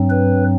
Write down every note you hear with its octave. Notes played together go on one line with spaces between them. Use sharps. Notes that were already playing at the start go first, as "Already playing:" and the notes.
Already playing: G2 F#3 C4
B4